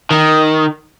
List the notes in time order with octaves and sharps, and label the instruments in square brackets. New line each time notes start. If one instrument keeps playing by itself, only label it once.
[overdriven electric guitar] D#3